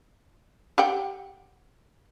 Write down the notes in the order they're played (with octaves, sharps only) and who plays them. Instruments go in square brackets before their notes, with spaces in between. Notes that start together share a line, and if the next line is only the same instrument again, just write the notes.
[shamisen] G4 F#5 G5